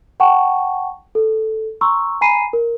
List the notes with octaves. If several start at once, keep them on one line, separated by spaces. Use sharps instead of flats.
F#5 G5 A5 C#6
A4
A#5 C6 C#6 E6
G#5 A#5 B5 C7 D#7
A#4